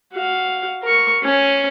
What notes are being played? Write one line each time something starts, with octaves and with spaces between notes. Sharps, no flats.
F#4 F5
A#4 C#6
C#4 G#5